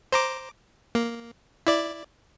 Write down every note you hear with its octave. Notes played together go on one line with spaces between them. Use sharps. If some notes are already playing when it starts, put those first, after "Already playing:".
C5 A#5 D6
A#3
E4 D5